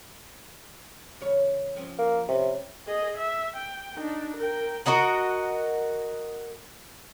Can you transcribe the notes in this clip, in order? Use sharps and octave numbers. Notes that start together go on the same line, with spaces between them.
E2 C#3 C#5
F3 C4 C#4
A#3
C3 C#4 B4
G#4 D#5
E5
G5
D4 D#4
A#4 G5
F#4 A#4 D#5 F#5